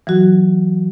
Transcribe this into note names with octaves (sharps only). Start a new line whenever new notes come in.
E3 F#3 F#4